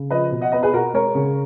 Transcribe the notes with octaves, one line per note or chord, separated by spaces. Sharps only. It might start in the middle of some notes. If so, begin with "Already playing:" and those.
Already playing: C#3
F3 B4 D#5
B2
D#5 F#5
B3 B4 D#5
G#4 B4
B2 F#4 A#4
G#3 A#4 C#5
C#3